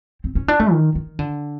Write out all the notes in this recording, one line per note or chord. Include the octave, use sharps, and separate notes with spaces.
C4
C#4
D4
A3
D#3
D#3
D3